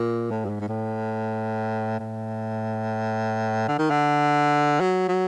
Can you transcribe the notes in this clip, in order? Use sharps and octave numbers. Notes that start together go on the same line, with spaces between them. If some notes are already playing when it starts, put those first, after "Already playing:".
Already playing: A#2
A2
G2
G#2
G#2
A2
A2
D3
D#3
D3
F#3
F#3